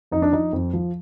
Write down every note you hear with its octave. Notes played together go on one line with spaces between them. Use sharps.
F2 D#4
D4
F3 D#4
F2
F3